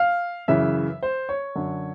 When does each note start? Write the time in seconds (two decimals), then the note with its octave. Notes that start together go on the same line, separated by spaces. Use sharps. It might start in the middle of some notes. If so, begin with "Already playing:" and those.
Already playing: F5
0.48 F#2 C#3 E3 E5
1.03 C5
1.29 C#5
1.55 F#2 D3